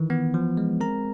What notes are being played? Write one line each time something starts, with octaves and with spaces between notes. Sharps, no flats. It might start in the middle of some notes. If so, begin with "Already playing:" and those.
Already playing: D#3 E3
B3
F3
G#3
C4 A#4 A#5